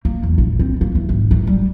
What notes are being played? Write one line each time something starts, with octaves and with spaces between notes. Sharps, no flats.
A#3
E2
A#1
C4
A#3
E3
G#1
E3
G3